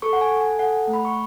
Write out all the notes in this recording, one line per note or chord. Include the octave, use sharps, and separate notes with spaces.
A4 C#6
F#5
G#5
A4
G#5
A4 F#5
A3
B5
C#6